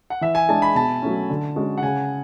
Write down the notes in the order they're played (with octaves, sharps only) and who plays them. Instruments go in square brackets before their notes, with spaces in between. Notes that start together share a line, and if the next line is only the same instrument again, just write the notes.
[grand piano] F#5
[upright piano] E3 [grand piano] E5
[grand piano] G#5
[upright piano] G#3 D4 [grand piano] A5
[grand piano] B5
[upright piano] B2 [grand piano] A5
[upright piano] F#3 A3 C#4
D3
G#3 C#4 F#4
[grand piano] F#5
[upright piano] C#3 [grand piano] G#5